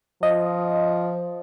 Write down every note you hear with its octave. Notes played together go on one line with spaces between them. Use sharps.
F3 D#5